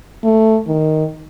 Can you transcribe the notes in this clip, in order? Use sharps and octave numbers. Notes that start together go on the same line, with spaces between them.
A3
D#3